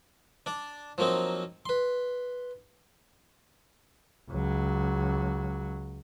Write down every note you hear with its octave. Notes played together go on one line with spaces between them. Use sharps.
D4 D5
F3 F#3 A#3 C4 D#4
B4 C6
C#2 F#3